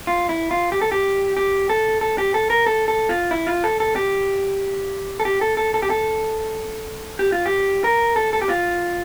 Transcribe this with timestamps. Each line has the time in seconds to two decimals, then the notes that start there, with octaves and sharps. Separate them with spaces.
0.07 F4
0.29 E4
0.51 F4
0.72 G4
0.81 A4
0.92 G4
1.37 G4
1.69 A4
2.01 A4
2.18 G4
2.34 A4
2.50 A#4
2.67 A4
2.88 A4
3.09 F4
3.31 E4
3.47 F4
3.64 A4
3.80 A4
3.96 G4
5.20 A4
5.25 G4
5.41 A4
5.57 A4
5.74 A4
5.82 G4
5.90 A4
7.19 G4
7.32 F4
7.46 G4
7.84 A#4
8.16 A4
8.33 A4
8.42 G4
8.49 F4